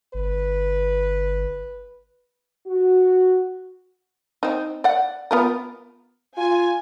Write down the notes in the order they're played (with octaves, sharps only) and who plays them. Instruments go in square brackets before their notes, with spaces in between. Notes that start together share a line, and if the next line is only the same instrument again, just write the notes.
[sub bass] G1 [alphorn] B4
[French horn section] F#4
[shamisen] C4 D#4
D5 F#5
B3 F4 A#4
[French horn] F4 [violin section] G#5